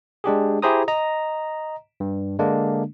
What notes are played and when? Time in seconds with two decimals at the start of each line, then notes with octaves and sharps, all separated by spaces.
0.24 G#3 D4 G4 G#4
0.62 E4 G4 G#4 C5 A#5 D#6
0.88 D#5 A#5
2.00 G2
2.39 D3 G#3 A#3 D4